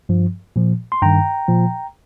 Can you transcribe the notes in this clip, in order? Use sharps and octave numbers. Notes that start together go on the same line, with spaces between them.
G2 F3
A#2 F3
C6
G2 D#3 G5 A#5
A#2 F3